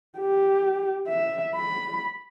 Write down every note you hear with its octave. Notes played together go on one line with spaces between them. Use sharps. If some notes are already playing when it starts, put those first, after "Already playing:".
G4
E5
B5